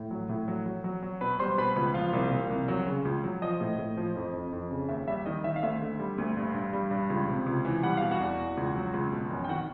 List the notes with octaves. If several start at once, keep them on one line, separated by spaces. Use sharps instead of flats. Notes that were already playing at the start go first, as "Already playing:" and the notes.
Already playing: A2
F#3
A2
F#3
F#3
F#3
F#3
B2 B4 B5
G3 C5 C6
B2 B4 B5
C#2 B4 B5
F3 F4 F5
C2
C2
C2
F#3
C#3
C#2
F#3
F3 D#5
A2
A2
F3
F2
F2
F2
C#3
D#2 E5
G3 E5
D#3 D#5
D#3 E5
F5
D2 E5
D3
G3
D2
G2
G2
G3
G2
C#2
C3
C#2
E3
G3 F#5
B2 F5
F#4 F#5
E2
E2
C#2
F#3
C#2
B2
F#2
G5
D#3 F#4 F#5